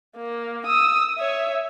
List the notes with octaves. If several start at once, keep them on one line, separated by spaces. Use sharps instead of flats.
A#3
D#6 E6
C#5 E5